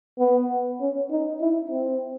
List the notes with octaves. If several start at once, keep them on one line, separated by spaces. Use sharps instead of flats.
B3
C#4
D#4
E4
C4